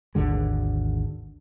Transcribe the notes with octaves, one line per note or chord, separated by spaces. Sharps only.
G#1 D#2 D3 G#3